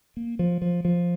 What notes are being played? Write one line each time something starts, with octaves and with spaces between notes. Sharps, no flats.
A#3
F3
F3
F3